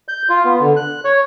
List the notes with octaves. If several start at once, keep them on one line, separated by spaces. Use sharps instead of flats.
G6
F4
B3
D3
F#6
C#5